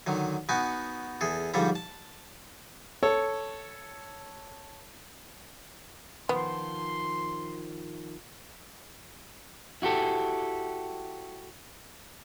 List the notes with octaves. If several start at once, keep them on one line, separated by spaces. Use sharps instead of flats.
D3 D#3 F#3
B3 D#4 F#4 G#5
E2 G#4 A4
G#2 D3 F3 G3 A4 A#5
A5
A4 C#5
D#3 F3 B3 C6
E4 F#4 G4 A4